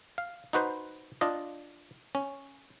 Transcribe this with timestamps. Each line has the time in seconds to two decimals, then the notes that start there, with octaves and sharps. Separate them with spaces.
0.18 F5
0.53 D#4 F#4 B4 C5
1.21 D4 F4 D#5
2.15 C#4